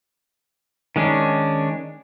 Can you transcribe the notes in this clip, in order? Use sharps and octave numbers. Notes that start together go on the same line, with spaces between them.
D#3 G#3 C#4 D4